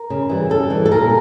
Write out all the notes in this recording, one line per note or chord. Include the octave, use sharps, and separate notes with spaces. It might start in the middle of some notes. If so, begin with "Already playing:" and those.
Already playing: A#4
C#3
E3 G3
C#3 A4
E3 G3
A4
A#2 A#4